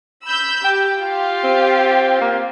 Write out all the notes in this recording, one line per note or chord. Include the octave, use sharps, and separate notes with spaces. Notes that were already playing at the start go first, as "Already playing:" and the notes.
B5 E6 G6
G4 G5
F4 G4
C4
A#3